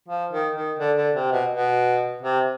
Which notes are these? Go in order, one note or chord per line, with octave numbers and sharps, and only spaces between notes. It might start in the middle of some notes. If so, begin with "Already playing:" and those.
F3
D#3
D#3
D3
D3
C3
B2
B2
C3